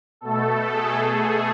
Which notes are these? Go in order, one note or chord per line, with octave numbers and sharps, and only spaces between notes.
B2 A3 A4
G#4